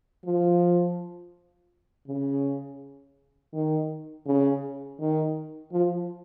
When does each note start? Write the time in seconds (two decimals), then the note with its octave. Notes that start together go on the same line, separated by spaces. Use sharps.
0.25 F3
2.08 C#3
3.53 D#3
4.26 C#3
5.00 D#3
5.72 F3